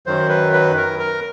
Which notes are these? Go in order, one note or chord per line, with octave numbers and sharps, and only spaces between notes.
F#2 D#3 F#3 C5
B4
B4
A#4
A#4